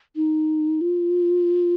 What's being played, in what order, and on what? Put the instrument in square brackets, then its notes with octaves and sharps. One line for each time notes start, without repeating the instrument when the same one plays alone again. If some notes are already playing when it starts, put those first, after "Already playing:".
[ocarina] D#4
F4